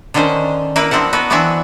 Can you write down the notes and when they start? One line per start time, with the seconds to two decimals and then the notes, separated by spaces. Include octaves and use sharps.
0.14 D3 D#3 C#4 D4 C5
0.76 A#3 E4 B4
0.91 F3 C4 D4 E4 F#5
1.13 B3 F#4 B4
1.30 E3 B3 C4 D4 E4 E5